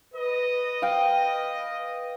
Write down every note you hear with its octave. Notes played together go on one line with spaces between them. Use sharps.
B4 D#5
F5 G5